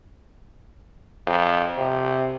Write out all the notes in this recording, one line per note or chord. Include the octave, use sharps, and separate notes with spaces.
F2
C3